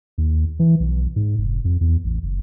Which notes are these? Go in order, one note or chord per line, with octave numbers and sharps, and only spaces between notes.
D#2
E3
B1
G#2
F1
F2
E2
A1
F#1